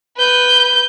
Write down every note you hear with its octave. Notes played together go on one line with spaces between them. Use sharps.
B4 G6